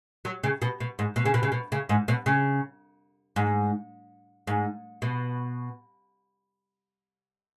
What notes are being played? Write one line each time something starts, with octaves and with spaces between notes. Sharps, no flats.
F#3
C#3
B2
B2
G#2
B2
C#3
B2
C#3
B2
C#3
G#2
B2
C#3
G#2
G#2
B2